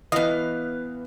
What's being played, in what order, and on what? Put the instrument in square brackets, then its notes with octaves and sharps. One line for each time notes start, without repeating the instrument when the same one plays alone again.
[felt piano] E3 [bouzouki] B3 F5 [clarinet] B4 [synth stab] D#5